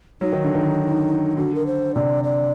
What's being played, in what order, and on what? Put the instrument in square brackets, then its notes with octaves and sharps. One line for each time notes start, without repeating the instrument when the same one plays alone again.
[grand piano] F#3 [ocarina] D#4
[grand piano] D#3
D3
D#3
[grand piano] D3 [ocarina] F#4
[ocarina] A#4
C5
[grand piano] C3 [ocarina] D5
[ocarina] D5